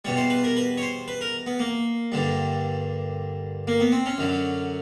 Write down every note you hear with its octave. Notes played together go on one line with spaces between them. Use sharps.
E2 B2 G3 C#5
C5
B4
A#4
B4
C#5
C5
B4
A#4
B3
A#3
G2 D3 G3
A#3
B3
C4
C#4
F#2 D3 F#3